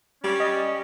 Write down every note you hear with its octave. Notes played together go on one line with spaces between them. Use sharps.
G3 C#4
D#5